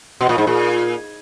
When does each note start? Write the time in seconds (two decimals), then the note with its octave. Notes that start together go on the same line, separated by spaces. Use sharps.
0.21 B2
0.29 A#2
0.38 G#2
0.47 A#2